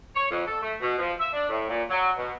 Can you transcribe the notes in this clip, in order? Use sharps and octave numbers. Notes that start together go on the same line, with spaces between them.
C#5
F2
A4
A3
B2
F3
E5
D4
A2
A#2
F#3
B2